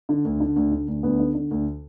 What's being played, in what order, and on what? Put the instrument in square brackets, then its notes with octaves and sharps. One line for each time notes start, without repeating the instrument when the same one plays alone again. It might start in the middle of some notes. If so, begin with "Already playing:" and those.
[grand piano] D3
D2
D3
D2
D3
D2
D2 B3
D3
D3
D2